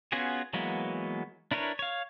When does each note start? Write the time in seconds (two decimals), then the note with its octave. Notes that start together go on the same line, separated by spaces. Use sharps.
0.12 B3 C#4 F4 F#4 G#4
0.53 E3 F#3 G#3 A#3 B3
1.51 D4 E4 A#4 B4 C#5
1.79 C#5 F5